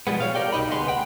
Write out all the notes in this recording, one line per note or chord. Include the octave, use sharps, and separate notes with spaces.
B2 F3 G3 G#3 B3
C#5 F5
G4 A#4 D5 G5
C2 B2 D#4 D#5 B5
D2 B3 G#4 B4 C6
F#5 G5